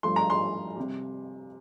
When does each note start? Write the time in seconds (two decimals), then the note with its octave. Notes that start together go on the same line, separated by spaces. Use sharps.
0.03 G2 F3 A3 C6
0.16 A#5
0.30 C6
0.76 C3 G3